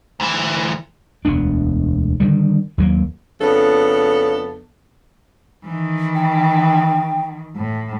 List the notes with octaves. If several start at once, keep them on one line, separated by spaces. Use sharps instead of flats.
D2 E3
E1 D2 B3 D4
D3 D#3 G3
D#2 F#3 A#3
F2 C#3 B3 D4 A4
D#3 E3
G5
A2